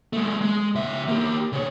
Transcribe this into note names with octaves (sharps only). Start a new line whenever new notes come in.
G#3 A3
G#3
C#3 E5
A#3 G4
C#3 C#5